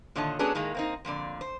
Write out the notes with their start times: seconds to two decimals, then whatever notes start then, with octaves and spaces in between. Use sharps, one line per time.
0.15 A#2 D3 D#3 C#5 D#5 A5
0.39 F#3 B3 C#4 D4 G#4 A4
0.55 A2 D#3 G#3 A#3
0.75 A#3 C4 D#4
1.05 F2 A#2 D3 D5
1.41 C5